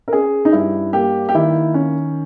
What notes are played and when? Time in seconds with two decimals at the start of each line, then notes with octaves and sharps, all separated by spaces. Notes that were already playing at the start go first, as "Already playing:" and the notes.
0.08 A#4
0.12 C#4 G#4
0.45 D#4
0.52 G2 E4
0.93 A#3 G4
1.29 G4
1.35 D#3 E4
1.74 C#4